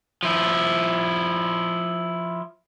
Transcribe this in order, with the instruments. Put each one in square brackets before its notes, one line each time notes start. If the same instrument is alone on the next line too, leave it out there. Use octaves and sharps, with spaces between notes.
[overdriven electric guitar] F3 E4